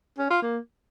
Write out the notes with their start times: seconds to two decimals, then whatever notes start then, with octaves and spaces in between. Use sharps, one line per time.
0.18 C#4
0.30 F4
0.42 A#3